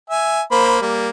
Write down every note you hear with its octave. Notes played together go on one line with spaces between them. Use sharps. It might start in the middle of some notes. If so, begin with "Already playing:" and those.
E5 G#5
A#3 C5 B5
G3 A#3